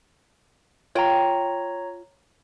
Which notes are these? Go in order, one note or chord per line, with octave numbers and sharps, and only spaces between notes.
F4 C#5 G5 A#5